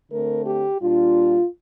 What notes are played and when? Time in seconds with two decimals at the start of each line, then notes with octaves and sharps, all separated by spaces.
0.10 D3 A3 C4 A#4
0.45 G4
0.81 A#2 G3 D4 F4